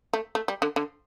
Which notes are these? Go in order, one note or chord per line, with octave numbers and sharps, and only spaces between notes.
A3
A3
G3
D3
D3